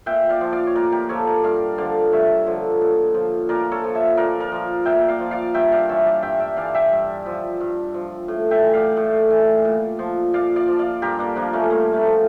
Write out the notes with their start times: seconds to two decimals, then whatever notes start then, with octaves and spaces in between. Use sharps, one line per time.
0.06 A#2 E5 G5
0.29 D5 F5
0.41 F3
0.52 D5 F5
0.67 C#5
0.76 A#2 A#4 D5
0.92 G4 A#4
1.09 F3 A4 C#5
1.27 A#4 D5
1.44 G2 D5 F5
1.78 D3 F3 D5 F5
2.12 G2 C#5 E5
2.46 D3 F3
2.81 A#2
3.14 F3
3.49 A#2 A#4 D5
3.72 A4 C#5
3.84 F3
3.95 C#5 E5
4.17 A#2 A#4 D5
4.40 A#4 D5
4.52 F3
4.86 A#2 E5 G5
5.08 D5 F5
5.20 F3
5.31 D5 F5
5.54 G2 E5 G5
5.72 D5 F5
5.89 E3 C#5 E5
6.06 D5 F5
6.22 G2 E5 G5
6.40 E5 G5
6.57 E3 D5 F5
6.74 E5 G5
6.92 G2
7.26 F3
7.60 G2
7.94 F3
8.28 A2
8.51 E5 G5
8.62 E3
8.73 D5 F5
8.97 A2
9.30 E3
9.65 A#2
9.99 F3
10.33 A#2 D5 F5
10.56 D5 F5
10.68 F3
10.79 D5 F5
11.02 G2 G4 A#4
11.19 A#3 D4
11.36 F3 A#3 D4
11.53 A3 C#4
11.70 G2 A#3
11.93 A3
12.05 F3